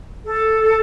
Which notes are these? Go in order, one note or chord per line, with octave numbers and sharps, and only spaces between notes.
A4